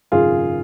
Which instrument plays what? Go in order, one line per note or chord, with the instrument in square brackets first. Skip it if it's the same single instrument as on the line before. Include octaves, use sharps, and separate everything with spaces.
[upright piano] G#1 F#2 C#3 F4 G#4